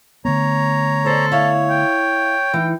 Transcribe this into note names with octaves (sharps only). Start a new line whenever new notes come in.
D3 A3 B3 C#5 A#5
A4 C5 D5
E4 C#5 F5
G5
E3 D#4